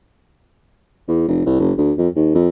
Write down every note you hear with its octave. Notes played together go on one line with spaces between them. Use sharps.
E2
F1
C2
F#1
D2
F2
D#2
F2